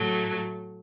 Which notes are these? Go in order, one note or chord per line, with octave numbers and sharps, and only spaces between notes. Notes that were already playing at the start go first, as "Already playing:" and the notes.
Already playing: A2 F#3 A3